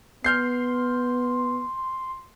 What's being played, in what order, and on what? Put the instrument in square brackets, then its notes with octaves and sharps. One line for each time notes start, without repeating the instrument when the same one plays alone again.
[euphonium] B3 [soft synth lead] C6 [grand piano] F6 G6 C7